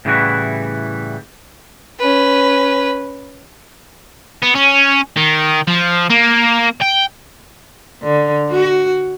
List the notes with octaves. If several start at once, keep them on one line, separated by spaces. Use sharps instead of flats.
A2 C#3 E3 G3 E4 F#4
C#4 B4
B3
C#4
D#3
F3
A#3
G5
D3
F#4